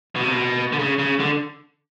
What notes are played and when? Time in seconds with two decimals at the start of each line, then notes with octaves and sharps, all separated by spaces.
0.16 B2
0.24 C3
0.32 B2
0.73 D3
0.79 C#3
0.99 C#3
1.20 D3